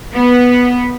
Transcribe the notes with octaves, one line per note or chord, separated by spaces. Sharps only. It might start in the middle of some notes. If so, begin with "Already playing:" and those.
B3